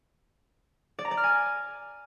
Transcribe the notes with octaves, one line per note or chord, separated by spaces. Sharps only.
D5
A#5
D5
F6
G#5